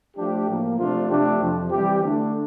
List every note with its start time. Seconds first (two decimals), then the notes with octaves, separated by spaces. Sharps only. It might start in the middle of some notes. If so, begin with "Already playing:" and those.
0.17 F3 A3 D4 G4
0.48 A2 F3 A#3
0.79 C3 F3 A3 D4 F4
1.09 C3 F3 A3 D4 G4
1.40 F2 C3 F3
1.70 E3 G3 C4 E4 G4
2.02 D3 A3 D4